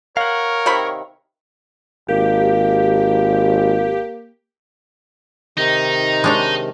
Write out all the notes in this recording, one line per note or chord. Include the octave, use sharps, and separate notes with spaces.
A#4 C#5 F5 F#5
C3 D#3 B5
G#1 A#3 G4
C3 D#3 D#4
G#3 D4 C#5